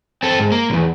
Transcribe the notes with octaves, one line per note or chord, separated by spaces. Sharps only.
C4 A4
G#2
A#3
B1 E2